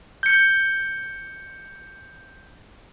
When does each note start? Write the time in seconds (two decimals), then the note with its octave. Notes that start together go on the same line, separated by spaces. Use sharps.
0.23 G6 C#7